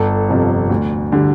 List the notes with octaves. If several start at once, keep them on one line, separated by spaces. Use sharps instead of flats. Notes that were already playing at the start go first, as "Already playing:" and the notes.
Already playing: G1 A4
F2 C3 F3
D2
D3 G3